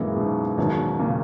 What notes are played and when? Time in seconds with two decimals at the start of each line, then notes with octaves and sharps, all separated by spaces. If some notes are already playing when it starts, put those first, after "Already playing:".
Already playing: F#2 A#2 E3 G#3
0.16 G#2 B2
0.58 E2 G#2 B2 D#3 F#3 C#4
0.99 A#2 C#3